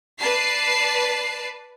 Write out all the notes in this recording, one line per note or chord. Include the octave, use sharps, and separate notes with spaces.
B4 D5 A5 C7